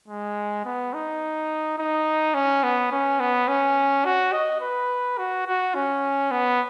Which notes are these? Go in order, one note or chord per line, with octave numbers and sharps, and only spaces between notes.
G#3
B3
D#4
D#4
C#4
B3
C#4
B3
C#4
F#4
D#5
B4
F#4
F#4
C#4
B3